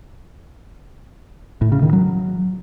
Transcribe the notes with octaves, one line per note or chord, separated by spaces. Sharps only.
A2
C#3
D#3
F#3